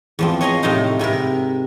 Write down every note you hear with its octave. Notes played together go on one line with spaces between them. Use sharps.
E2 F3 C4
C#5 D#5 G#5 A#5 C6
A2 C3 C4 D#4 F5
G#2 C3 E4 A#4